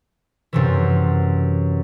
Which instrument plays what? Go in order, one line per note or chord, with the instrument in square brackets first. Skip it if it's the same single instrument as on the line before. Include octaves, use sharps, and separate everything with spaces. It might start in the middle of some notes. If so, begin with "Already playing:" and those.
[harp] F#2 C3 E3